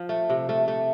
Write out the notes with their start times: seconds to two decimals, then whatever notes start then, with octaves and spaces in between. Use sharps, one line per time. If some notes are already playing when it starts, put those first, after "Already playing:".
Already playing: F3
0.09 A3
0.30 C3
0.49 A3
0.68 A3